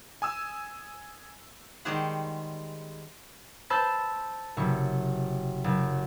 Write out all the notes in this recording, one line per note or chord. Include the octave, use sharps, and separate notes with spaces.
G#5 D#6 E6
D#3 G3 G#3 G#4 C5 F#5
C5 A5 B5 E6 G6 A6
F#1 C3 C#6
F#1